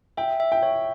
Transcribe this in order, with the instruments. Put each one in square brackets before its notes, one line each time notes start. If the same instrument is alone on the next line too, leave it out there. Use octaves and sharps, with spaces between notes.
[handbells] E5 [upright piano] G5
[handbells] E5
[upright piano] G5
[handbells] C#5